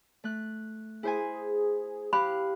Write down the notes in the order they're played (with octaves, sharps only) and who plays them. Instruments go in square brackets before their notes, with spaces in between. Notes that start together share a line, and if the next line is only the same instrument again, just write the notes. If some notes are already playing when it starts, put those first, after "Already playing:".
[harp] A3 F#6
[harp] E4 C5 G#5 [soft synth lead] G#4
[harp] G4 F5 F#6 [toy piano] B5